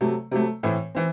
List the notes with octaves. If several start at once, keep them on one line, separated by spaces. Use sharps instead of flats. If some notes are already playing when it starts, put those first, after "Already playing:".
C3 F#3 A3
C3 F#3 A3
A2 E3 C4
E3 C4